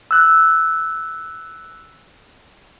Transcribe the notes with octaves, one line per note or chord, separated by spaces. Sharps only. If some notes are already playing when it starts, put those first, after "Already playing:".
E6 F#6